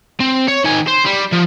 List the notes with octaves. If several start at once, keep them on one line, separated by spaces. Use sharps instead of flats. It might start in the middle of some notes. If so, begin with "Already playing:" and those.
C4
C#5
D#3 G#5
C5
G3
F3